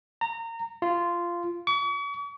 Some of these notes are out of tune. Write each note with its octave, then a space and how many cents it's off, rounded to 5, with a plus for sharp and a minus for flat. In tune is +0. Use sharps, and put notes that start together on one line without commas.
A#5 -25
F4 -10
C#6 +45